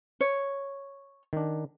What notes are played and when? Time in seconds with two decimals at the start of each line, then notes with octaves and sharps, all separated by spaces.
0.21 C#5
1.33 D#3 D4